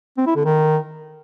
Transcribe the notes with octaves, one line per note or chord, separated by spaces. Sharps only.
C4
E4
D3
D#3